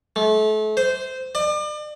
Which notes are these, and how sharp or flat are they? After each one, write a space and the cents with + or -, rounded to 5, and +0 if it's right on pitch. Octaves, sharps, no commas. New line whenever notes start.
A3 -35
C5 -15
D5 +40